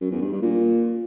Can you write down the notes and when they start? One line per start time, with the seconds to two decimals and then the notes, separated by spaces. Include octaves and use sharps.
0.01 F#2
0.11 E2
0.21 G2
0.32 G2
0.42 A#2